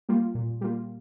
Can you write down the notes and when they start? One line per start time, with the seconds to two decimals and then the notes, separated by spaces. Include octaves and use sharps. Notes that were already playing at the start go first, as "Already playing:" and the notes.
0.09 G3 A#3 F4
0.35 A#2
0.61 G3 A#3 F4